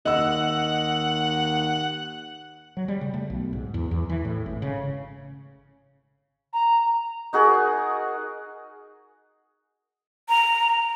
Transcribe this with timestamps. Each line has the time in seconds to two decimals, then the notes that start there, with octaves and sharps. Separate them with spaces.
0.06 D#2 D#5 F#5 E6
2.77 F#3
2.88 G3
3.01 C#3
3.14 A3
3.30 B1
3.53 G#2
3.74 E2
3.91 E2
4.10 E3
4.25 A2
4.46 G#1
4.62 C#3
6.53 A#5
7.33 D#4 F#4 G#4 A#4
10.29 A#5